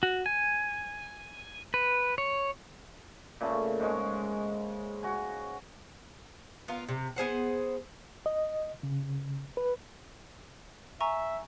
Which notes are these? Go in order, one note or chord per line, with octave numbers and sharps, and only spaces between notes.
F#4
G#5
B4
C#5
A#2 C#3 A3
G#2 G#3 C#5
F#4 G#5
B3 F4 A#4
C3
B3 G#4 C5 F#5
D#5
C#3
B4
E5 G#5 A#5 C#6